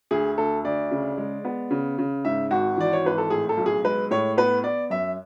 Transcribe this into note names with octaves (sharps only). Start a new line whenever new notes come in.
D2 G#4
D2 A4
D2 D5
C#3
G#3
B3
C#3
C#3
G#2 E5
G#1 F#4
E3 D5
C#5
G#1 B4
A4
A2 G#4
A4
B1
G#4
G#3 B4
A2 C#5
B3 B4
B3 D5
F#2 E5